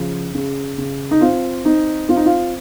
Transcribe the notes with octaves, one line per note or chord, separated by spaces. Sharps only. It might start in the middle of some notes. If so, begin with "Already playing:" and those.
Already playing: C#3 F3
C#3
C#3
D#4
C4 F4
C4 D#4
C4 F4
D#4
F4